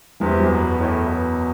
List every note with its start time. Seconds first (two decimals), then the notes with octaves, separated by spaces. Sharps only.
0.20 E2 C3 E3
0.39 F#2 F#3
0.49 B2
0.78 A2
1.07 B2